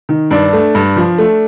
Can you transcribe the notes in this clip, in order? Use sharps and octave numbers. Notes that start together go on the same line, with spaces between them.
D#3
G2 D4
A3
G2
F3
A3